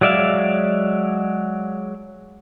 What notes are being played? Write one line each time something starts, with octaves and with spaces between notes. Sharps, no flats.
F#3 G#3 D5 E5 F5